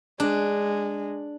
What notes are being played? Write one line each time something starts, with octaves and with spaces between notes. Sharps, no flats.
G#3 D4